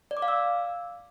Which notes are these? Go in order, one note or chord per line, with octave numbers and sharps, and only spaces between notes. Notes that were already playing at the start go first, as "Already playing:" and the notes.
D5
D6
F5
E6